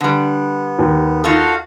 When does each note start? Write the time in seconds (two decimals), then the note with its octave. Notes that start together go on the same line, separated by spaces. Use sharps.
0.01 D3 G3 B3
0.79 D#2
1.24 D#4 F4 F#4 A4 F5 F#5